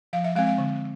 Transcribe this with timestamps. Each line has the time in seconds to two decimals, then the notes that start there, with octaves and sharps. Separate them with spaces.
0.13 F3 F5
0.24 E5
0.36 G#3 C4 F5
0.47 F5
0.58 D3